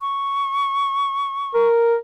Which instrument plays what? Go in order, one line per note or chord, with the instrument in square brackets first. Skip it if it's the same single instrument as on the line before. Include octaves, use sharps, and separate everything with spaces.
[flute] C#6
[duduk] A#4